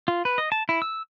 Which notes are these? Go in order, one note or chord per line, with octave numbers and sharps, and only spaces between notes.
F4
B4
D#5
A5
E4
E6